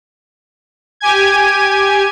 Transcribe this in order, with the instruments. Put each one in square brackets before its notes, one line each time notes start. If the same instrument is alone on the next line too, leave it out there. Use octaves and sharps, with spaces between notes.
[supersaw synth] G4 G#5 G#6